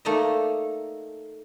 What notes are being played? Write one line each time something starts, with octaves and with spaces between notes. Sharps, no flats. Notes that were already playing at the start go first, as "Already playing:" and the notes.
A3 A#3 D#4 A4 D5 D#5